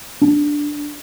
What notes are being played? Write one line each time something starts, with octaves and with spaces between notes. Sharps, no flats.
D4